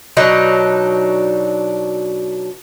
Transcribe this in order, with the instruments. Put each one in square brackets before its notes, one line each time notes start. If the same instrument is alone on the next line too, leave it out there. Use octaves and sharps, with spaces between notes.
[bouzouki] B2 F#3 D4 D#4